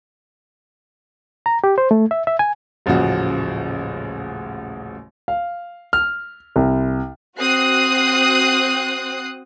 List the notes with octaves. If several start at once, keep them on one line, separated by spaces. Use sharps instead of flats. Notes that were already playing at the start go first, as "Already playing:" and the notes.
A#5
G4
C5
A3
E5
E5
G#5
D#1 A1 C#3 F3 F#4
F5
F6
C2
C4 F#4 D#6 F#6 C7